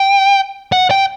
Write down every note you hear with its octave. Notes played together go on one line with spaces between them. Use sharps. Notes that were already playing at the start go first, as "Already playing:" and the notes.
Already playing: G5
F#5
G5